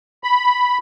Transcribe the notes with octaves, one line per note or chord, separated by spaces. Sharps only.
B5